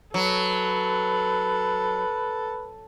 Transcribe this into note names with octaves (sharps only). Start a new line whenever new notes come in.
F#3 A4 B4